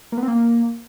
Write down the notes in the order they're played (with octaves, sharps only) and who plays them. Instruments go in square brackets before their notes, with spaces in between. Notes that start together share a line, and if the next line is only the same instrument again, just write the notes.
[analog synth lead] A#3
B3
C4
A#3